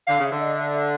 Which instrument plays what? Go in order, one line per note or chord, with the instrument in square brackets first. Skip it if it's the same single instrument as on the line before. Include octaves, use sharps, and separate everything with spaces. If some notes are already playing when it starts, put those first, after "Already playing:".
[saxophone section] D3 [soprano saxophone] F5
[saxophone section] C#3 [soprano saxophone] E5
[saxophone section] D3
[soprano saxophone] D#5
E5
E5